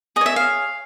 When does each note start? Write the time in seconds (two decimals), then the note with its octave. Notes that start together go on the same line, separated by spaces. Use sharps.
0.16 G#4 D#5
0.21 C#5 E5
0.36 F5